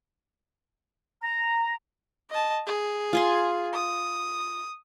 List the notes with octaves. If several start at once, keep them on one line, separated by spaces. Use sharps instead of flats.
A#5
D#5 A5
G#4
F4 G#5 C6
D#6